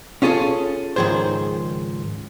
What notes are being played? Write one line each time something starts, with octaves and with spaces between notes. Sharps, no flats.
C#4 F4 G#4 A4 C#5
C#2 G#2 D#3 F3 G#4 C5